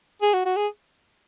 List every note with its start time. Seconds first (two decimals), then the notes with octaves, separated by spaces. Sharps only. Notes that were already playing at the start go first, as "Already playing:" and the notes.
0.22 G#4
0.34 F#4
0.45 F#4
0.57 G#4